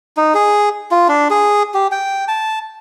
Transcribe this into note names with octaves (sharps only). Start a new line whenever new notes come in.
D#4
G#4
F4
D4
G#4
G4
G5
A5